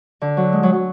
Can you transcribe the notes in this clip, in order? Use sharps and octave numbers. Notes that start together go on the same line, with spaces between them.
D3
F#3
G#3
F#3
F#3